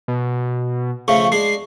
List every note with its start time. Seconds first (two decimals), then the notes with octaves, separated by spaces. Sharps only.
0.08 B2
1.08 C#3 F3 A3 C#6
1.32 G#3 D4 G#4 C7